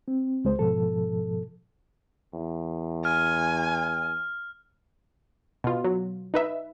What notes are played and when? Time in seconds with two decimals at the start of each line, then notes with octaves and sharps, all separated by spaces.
0.08 C4
0.45 C#2 G#3 C5
0.59 G#2 B2 F3 A4
2.33 E2
3.05 G#5 F6
5.64 B2 F4
5.84 F#3
6.34 D#4 B4 E5